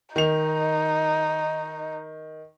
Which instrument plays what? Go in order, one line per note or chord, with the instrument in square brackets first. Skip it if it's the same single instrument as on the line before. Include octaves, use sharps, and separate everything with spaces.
[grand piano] D#3 F7 [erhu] D#4